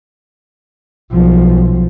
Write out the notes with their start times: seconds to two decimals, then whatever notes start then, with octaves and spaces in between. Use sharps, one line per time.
1.12 B1 F3